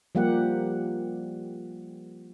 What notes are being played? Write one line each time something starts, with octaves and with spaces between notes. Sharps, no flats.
F3 G3 A#3 G4 F#5